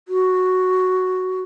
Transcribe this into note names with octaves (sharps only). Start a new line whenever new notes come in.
F#4